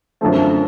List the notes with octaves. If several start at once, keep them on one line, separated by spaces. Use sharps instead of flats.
F#2 D3 F3 A3 C4